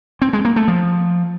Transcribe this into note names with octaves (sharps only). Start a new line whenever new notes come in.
C4
G#3
A#3
A3
F3